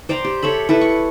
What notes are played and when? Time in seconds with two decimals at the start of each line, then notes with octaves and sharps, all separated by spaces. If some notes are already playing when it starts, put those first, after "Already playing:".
0.09 C5 D5 G5 A#5
0.24 G4
0.43 A4 C#5 E5 B5
0.69 E4 A4 B4 E5
0.81 C#6